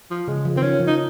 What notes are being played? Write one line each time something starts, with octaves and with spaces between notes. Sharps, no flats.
F3
C#3 G#3
F3
D#3 C4
F3 C#4
F3
D#4